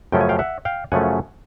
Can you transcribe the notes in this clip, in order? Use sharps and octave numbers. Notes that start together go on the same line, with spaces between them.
F#2 C#3 F3 A3 C#4 G5
G#5
F5 G5
E5 F#5
F5 G5
F#2 C#3 F3 A3 C#4 F#5 G#5